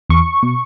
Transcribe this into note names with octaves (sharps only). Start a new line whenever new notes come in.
E2 C#6
B2